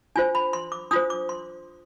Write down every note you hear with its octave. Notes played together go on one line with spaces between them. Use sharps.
D4 F4 C5 G#5
B5
C6
D6
D4 F4 C5 D#6
D6
C6